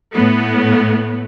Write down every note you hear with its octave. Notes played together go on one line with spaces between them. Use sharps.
A2 A3 B3